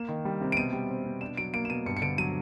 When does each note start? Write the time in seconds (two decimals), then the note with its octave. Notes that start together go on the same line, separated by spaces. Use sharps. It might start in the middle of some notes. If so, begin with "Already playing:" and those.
Already playing: A#3 E7
0.09 D#3
0.25 G3
0.41 C3
0.52 D7
0.57 B2 D#7
0.73 G3
0.90 C4
1.06 B2
1.21 D4 E7
1.37 F#3 D7
1.54 A#3 D7
1.65 E7
1.70 B2 D#7
1.86 G2 C#7
1.97 C#7
2.02 D3 D7
2.18 F#3 D#7